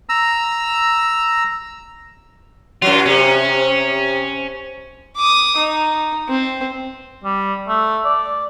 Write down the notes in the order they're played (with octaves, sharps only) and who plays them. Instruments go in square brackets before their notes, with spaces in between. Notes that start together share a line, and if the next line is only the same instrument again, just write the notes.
[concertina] A#5 E6
[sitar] F#2 F#3 [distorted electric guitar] F4
[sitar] C3 [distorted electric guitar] C#4
[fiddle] D6 D#6
D#4
C4
[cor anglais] G3
A3
D5